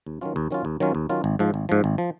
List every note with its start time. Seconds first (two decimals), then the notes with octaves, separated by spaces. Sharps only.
0.06 D#2
0.21 D#3 F#3 C#4 F4
0.36 D#2
0.51 D#3 F#3 C#4 F4
0.65 D#2
0.80 D#3 F#3 C#4 F4
0.95 D#2
1.09 D#3 F#3 C#4 F4
1.24 G#1
1.39 G#2 F3
1.54 G#1
1.69 G#2 F3
1.84 G#1
1.98 F3